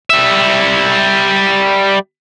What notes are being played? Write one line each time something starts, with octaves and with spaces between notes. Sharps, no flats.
G3 E5